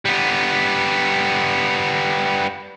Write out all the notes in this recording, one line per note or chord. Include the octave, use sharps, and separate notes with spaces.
G3 B3